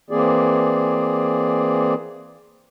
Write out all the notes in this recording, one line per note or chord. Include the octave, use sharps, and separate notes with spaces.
E3 A#3 C4 G#4 D5